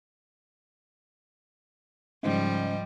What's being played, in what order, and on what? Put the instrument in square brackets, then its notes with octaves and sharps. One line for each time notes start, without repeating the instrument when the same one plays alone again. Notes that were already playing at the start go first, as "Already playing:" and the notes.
[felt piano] G#2 C#3 [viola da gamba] F3 G3